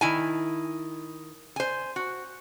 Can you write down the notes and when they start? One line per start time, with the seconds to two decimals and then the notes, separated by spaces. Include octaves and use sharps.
0.01 D#3 E4 G#5
1.56 C5 G#5
1.96 F#4